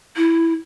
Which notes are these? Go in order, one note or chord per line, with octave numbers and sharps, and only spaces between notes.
E4